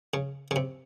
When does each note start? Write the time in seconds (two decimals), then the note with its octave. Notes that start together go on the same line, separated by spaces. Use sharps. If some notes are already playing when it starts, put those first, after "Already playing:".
0.14 C#3
0.51 C#3
0.56 C3